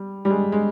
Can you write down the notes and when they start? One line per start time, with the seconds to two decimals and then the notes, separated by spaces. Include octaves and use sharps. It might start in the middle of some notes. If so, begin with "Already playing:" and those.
Already playing: G3
0.25 G3
0.30 G#3
0.52 G#3